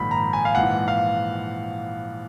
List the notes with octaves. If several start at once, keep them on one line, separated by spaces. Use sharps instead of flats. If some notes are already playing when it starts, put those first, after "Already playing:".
Already playing: A#1 G#2 D#3 B5
A#5
G#5
F5
A#1 G#2 E3 F#5
F5